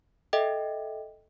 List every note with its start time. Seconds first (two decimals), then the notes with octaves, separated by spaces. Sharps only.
0.33 A4 D#5 E5 G5